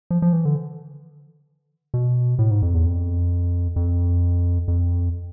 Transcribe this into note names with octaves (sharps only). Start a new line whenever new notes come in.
F3
F3
E3
D3
B2
A2
G#2
F2
E2
F2
F2
F2